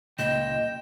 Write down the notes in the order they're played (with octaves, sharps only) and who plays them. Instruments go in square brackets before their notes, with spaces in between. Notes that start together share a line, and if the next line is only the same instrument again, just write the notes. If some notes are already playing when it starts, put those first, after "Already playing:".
[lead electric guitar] C#2 A#2 [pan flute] D#5 [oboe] G5 [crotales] E7